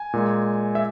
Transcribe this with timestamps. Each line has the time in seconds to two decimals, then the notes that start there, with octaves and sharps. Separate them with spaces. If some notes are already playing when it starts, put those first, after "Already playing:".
Already playing: G#5
0.13 A#2 G#3
0.75 E5